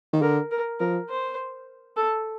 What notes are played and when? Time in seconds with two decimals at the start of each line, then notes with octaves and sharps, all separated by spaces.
0.13 D#3
0.22 D3 A#4
0.51 A#4
0.80 F3 A#4
1.10 C5
1.97 A4